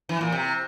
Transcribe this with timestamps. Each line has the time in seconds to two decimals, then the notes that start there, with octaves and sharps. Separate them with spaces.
0.09 E3
0.21 A#2
0.32 C3